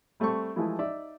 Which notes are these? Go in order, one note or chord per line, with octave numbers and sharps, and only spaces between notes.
G3 A3 C4 A4 C#6
E3 F3 G#3 A3 E4
D#4 D5 E5